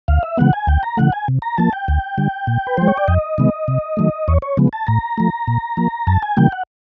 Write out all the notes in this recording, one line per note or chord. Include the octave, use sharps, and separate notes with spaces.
D2 F5
E5
C#3 E3 G#3 B3 F#5
G#5
D2 G5
A#5
C#3 E3 A3 F#5
G#5
C3
A#5
F3 A#3 A5
G5
D2
D3 G3
A#2
B4
F3 G#3 C5
C#5
D5
F2 D#5
C3 D#3 G#3 B3
C3
D#3 F#3 A3
E2 C#5
C#5
C#3 F3 G#3 B3
A5
A2 A#5
F3 A3
A#2
F3 A#3
F#2 A5
G#5
C#3 E3 G3 A#3 G5
F#5